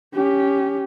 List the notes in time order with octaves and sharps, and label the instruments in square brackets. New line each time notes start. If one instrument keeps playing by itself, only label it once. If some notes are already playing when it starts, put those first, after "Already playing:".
[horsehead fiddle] C#4 G4